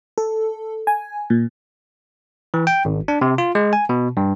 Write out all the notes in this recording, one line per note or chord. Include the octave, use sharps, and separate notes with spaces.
A4
G#5
A#2
E3
G5
G#1
D4
C3
F4
G#3
G#5
B2
G2